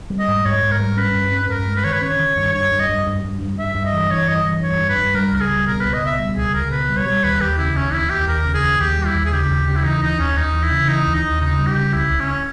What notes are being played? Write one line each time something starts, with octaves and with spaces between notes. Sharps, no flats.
G3
D#5
G#2
G#2 C#5
G#2
A#4
G3
C#4 B4
G2
C#4
G2 A#4
G#3
B4
D#3 C#5
B4
C#4 C#5
D#3
G2
G2 C#5
G2
D#5
G2
G2
G2
G2
G2 E5
G2
D#5
E3
E3 C#5
G2 D#5
E3
G2 C#5
G2
B4
G2
G3 A#4
C#2 A#4
G#4
G3
B2 A#4
C#2 B4
D#5
B2 E5
G3
C#2 G#4
C#2 A#4
B2 B4
G3
C#5
G3
D#2 B4
D#2 G4
C#3 E4
D#2 C#4
D#2 E4
D#2 G4
D#2 A#4
C#3
G#4
D#2
D#2 G4
G3
E4
D#2
G#4
C#3 G4
D#2
C#3 G4
E4
E3 D#4
D#2 D#4
D#2 C#4
D#2 D#4
E3
E4
C#3
E3 D#4
D#2
D#4
D#2
C#3 D#4
G3
G4
C#3
C#2 E4
C#2
C#4